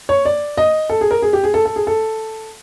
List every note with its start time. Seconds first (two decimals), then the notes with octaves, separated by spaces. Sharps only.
0.09 C#5
0.25 D5
0.57 D#5
0.90 A4
1.01 G#4
1.11 A#4
1.22 G#4
1.33 G4
1.44 G#4
1.54 A4
1.65 A4
1.76 G#4
1.87 A4